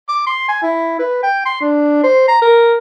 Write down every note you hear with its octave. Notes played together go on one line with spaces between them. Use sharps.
D6
C6
G#5
E4
B4
G5
C6
D4
C5
A#5
A#4